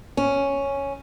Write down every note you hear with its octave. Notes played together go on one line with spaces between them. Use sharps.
C#4